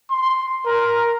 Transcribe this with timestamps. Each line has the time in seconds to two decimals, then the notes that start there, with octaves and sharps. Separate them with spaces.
0.11 C6
0.66 A#4